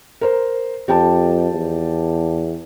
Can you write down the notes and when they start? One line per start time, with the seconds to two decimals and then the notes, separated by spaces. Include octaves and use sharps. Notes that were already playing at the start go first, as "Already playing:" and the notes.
0.21 A#4 C5
0.88 F2 G4 G5 A5
1.54 E2